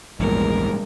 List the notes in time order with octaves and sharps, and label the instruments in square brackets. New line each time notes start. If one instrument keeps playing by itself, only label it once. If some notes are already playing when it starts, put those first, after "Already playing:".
[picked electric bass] A#1 E2 [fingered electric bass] G#2 G3 [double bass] G#3 [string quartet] A#4